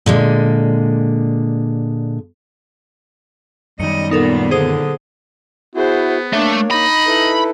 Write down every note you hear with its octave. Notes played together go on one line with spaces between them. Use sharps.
A#2 D3 G#3
F#2 D#3 G3 D#5 C#7
A#2 B3 D#4 A4 A#4
D3 G#4 C5 D#6
B3 E4 F#4 G#4 C5
A3 A#3 D4 C#5
D#4 D#5 B5
E4 A4 B4